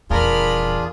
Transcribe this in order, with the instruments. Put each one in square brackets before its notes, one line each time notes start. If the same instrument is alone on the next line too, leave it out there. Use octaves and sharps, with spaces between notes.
[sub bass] D#1 [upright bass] E2 [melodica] D4 F4 G#4 [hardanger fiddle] A#4 B5